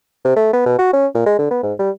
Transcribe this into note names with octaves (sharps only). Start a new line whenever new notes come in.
C3
A3
B3
B2
F#4
C#4
A#2
G#3
D3
B3
G#2
G3